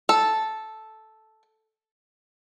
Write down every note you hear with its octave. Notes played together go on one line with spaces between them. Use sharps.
A4